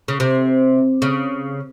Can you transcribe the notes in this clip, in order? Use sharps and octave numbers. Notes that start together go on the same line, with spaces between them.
C#3
C3
C#3